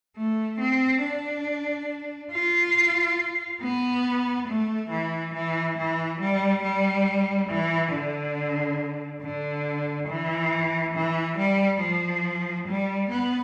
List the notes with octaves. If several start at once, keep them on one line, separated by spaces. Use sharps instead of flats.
A3
C4
D4
F4
B3
A3
E3
E3
E3
G3
G3
E3
D3
D3
E3
E3
G3
F3
G3
B3